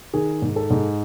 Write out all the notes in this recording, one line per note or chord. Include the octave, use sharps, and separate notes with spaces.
D#3 G#4
G#2
A4
G#2